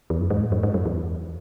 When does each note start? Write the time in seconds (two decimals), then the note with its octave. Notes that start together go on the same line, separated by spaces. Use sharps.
0.10 E2
0.20 F#2
0.30 G#2
0.41 A2
0.52 F#2
0.63 G#2
0.74 F#2
0.86 E2